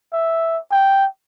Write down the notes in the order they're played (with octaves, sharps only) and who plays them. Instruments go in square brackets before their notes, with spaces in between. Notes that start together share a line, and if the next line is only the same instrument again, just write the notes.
[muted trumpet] E5
G5